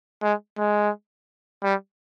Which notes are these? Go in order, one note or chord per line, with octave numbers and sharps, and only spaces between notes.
G#3
G#3
G3